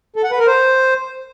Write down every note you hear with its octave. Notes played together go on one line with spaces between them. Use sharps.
A4
F#5
B4
A#4
C5